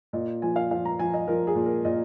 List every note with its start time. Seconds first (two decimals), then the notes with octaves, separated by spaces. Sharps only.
0.13 A#2 D#5
0.42 F3 G#5
0.56 F5
0.71 F3 F5
0.85 A#5
0.99 F3 G#5
1.14 D#5
1.27 F3 A#4
1.47 G#4
1.55 A#2
1.66 A#4
1.85 A#2 D#5